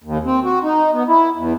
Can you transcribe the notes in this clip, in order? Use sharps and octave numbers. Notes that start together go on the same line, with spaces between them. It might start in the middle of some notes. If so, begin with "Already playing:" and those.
D#2
C4
F#4
D#4
B3
E4
E2